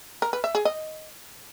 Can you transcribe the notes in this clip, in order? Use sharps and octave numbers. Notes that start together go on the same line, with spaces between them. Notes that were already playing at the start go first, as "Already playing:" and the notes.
A#4
B4
E5
G#4
D#5